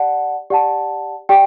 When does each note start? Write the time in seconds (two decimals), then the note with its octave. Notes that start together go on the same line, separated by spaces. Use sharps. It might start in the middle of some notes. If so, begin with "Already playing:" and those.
Already playing: G4 D5 F#5 A5
0.50 G4 D5 F#5 A5
1.29 G4 D5 G5